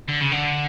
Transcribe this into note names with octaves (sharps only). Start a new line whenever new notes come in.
D3
C#3
D3